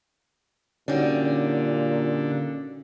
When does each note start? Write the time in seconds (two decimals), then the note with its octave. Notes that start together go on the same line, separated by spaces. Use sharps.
0.88 A#2 D3 G3 C#4 D#4 F#4